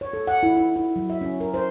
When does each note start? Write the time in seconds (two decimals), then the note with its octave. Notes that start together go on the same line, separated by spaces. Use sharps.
0.01 C#5
0.13 A4
0.27 F#5
0.43 E4
0.57 E4
0.76 E4
0.96 F#3
1.10 E5
1.21 C#4
1.40 A#4
1.54 C5